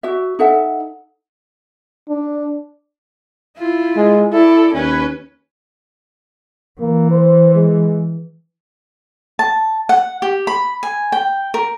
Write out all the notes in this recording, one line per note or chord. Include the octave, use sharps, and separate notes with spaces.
F#4 E5
D#4 A4 E5 F#5
D4
E4 F4
G#3
E4 A4 D5
D#2 C#4 B4
E3 A#3
C5
G#3
A5
F#5
G4
B5
G#5
G5
A#4